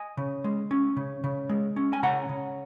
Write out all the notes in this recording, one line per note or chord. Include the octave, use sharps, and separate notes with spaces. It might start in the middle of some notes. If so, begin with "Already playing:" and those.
Already playing: D#5 G#5
C#3
G#3
C#4
C#3
C#3
G#3
C#4
G#5
C#3 F#5 A#5
C#3